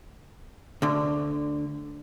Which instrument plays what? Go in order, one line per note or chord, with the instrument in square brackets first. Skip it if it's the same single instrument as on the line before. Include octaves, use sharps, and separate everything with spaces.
[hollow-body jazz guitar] D2 D3